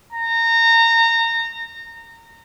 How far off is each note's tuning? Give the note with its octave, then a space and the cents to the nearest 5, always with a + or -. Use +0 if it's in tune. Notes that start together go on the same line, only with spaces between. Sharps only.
A#5 -25